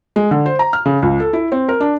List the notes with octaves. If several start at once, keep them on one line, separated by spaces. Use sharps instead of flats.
G#3
D3
C5
A#5
F6
C#3
C#2
A4
E4
C4
A#4
D4